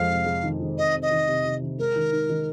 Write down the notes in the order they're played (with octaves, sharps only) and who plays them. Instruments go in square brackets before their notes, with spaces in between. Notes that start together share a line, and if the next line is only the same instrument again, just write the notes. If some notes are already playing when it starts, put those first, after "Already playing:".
Already playing: [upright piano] F2 G#3 [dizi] F5
[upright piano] C3
G#3
D#3
D#3
[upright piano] C4 [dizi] D#5
[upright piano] C3
[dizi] D#5
[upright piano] D#3
C3
C3
D#3
[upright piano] G#3 [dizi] A#4
[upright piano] D#3
D#4
D#3